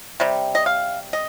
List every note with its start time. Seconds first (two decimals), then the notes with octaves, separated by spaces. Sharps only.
0.20 C3 G3
0.55 D#5
0.66 F5
1.13 D#5